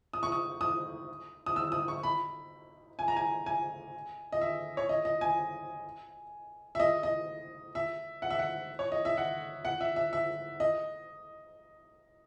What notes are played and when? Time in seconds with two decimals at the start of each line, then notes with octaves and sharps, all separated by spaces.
0.13 D#6
0.23 C#6
0.32 D#6
0.61 D#6
1.46 D#6
1.56 E6
1.72 D#6
1.88 C#6
2.03 B5
2.99 G#5
3.08 A#5
3.16 G#5
3.46 G#5
4.32 D#5
4.41 E5
4.77 C#5
4.89 D#5
5.05 D#5
5.21 G#5
6.75 E5
6.80 D#5
7.03 D#5
7.75 E5
8.22 F#5
8.30 E5
8.39 F#5
8.79 C#5
8.92 D#5
9.05 E5
9.17 F#5
9.65 F#5
9.81 E5
9.96 E5
10.13 E5
10.60 D#5